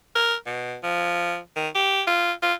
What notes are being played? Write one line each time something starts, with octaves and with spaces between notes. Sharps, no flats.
A#4
B2
F3
D#3
G4
F4
F4